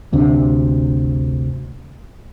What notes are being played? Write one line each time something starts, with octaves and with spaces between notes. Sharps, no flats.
G1 D2 C3 D4